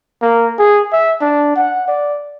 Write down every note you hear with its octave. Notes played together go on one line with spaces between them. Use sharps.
A#3
G#4
E5
D4
F#5
D5